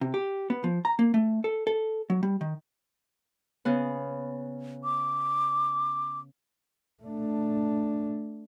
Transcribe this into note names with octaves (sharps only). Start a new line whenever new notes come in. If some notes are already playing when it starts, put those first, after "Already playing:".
C3
G4
B3
F3
A#5
A#3
A3
A4
A4
F#3
G3
D#3
C#3 B3
D6
A3 D4